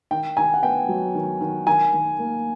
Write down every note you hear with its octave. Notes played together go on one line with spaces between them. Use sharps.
D#3 G5
D#3 G#5
F#5
B3 G5
F#3
D#3
D#3
D#3 G#5
D#3
A#3